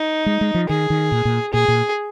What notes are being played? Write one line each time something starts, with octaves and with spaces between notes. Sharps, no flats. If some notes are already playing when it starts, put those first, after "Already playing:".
Already playing: D#4
G#3
G#3
F3
D#3 G#4
D#3
A#2
A#2
A#2 G#4
A#2